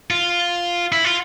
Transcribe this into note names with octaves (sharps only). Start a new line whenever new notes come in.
F4
E4
F4